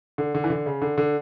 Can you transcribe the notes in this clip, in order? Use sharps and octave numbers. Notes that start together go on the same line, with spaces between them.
D3
D3
E3
D3
C#3
D3
D3